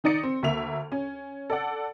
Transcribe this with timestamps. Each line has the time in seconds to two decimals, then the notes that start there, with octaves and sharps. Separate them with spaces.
0.04 D#3 D#4 D5 C#7
0.23 C4
0.43 D2 A#3 E5 F7
0.92 C#4
1.50 A4 D5 F#5